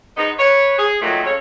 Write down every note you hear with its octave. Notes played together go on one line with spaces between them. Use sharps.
G#2 B3 D#4
B4 C#5
G#4
A#2 D#3 F3 F#3 A3
C#3 C#4 A4 C#5